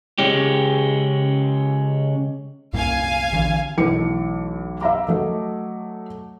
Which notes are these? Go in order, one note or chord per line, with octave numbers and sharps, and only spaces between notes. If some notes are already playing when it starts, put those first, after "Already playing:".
C#3 G#3 C#4 G4
C2 F#2 A#2 F5 G#5
A#1 D3 E3
B1 E3 A3 D6 C#7
E5 F5 A#5 D6
F#3 A3 D#5